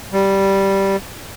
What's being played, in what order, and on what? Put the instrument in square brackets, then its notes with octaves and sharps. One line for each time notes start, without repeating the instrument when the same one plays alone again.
[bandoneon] G3